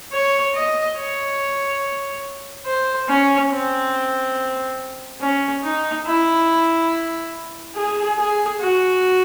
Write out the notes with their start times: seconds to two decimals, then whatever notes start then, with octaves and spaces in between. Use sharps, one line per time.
0.12 C#5
0.55 D#5
0.97 C#5
2.66 C5
3.09 C#4
3.51 C4
5.21 C#4
5.64 D#4
6.06 E4
7.76 G#4
8.18 G#4
8.60 F#4